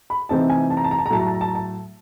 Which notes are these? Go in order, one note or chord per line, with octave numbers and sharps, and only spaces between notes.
B5
C3 E3 A3 C4 D#4 A5
G#5
A5
A#5
A5
A#5
A5
A#5
A2 F#3 A3 A5
A#5
A5
A#5
A5
A#5
A5